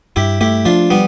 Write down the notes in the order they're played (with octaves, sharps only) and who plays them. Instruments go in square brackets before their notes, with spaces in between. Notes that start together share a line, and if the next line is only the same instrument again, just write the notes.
[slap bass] G2 [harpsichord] E4 G4
[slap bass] A3 [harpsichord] E4 G4
[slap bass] F3 [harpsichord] D4 F4
[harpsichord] G3 B3